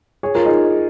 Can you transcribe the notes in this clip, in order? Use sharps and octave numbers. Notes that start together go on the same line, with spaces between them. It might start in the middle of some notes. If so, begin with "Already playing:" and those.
G#4 C#5
F4 A#4
D#4 G#4